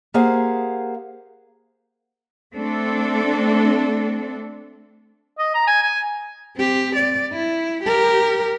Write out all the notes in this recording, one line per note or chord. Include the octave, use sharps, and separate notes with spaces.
A#3 G4 G#4 C5 F5 F#5
A3 C4 D4 A4
D#5
A#5
G#5
G#5
C4 G4
D5
E4
G4 A#4